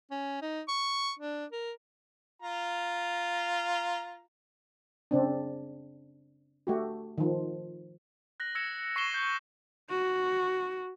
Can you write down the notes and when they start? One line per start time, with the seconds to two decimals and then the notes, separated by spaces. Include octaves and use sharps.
0.11 C#4
0.42 D#4
0.68 C#6
1.19 D4
1.52 A#4
2.42 F4 A#5
5.11 C#3 C4 D4
6.67 A3 F#4 G4
7.18 D#3 F3
8.40 F#6 A#6 F#7
8.55 E6 G#6 A#6 C#7 E7
8.96 C#6 B6 C7 E7 G7
9.14 G6
9.90 F#4